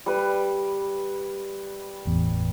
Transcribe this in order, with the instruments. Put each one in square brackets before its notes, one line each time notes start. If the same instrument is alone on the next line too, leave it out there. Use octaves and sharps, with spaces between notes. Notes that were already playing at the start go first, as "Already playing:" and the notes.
[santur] G3 B4
[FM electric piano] G1 E2 A2